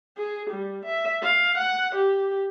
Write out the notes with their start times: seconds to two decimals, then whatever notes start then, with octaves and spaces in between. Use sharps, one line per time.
0.17 G#4
0.51 G3
0.86 E5
1.23 F5
1.58 F#5
1.95 G4